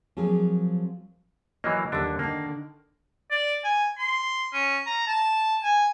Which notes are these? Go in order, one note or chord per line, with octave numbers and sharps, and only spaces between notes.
F3 F#3 A#3 C4 G#4
E3 F#3 A#3 D#5
D#2 D3 G3 D4
D3 D#3 A#3
D5
G#5
C6
C#4
A#5
A5
G#5